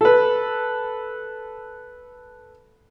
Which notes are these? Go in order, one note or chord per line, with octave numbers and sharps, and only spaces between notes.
A4 B4